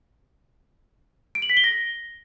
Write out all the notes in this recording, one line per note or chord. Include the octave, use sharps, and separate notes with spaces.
D7
F#7
B6
G7
A#6